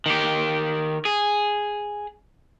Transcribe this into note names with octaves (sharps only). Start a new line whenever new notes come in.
D#3 G4
G#4